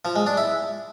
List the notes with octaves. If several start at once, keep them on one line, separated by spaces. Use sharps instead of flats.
F3
G#3
D4
E4